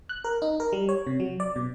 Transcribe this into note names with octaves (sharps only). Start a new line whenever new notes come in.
F#6
A#4
D#4
A#4
G3
C#5
C3
F#3
D5
B2